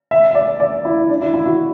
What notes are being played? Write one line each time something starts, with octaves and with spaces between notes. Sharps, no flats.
E5
E5
D5
D5
E4
D4
E4
E4
F#4